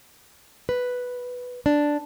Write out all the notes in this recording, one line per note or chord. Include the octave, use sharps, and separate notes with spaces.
B4
D4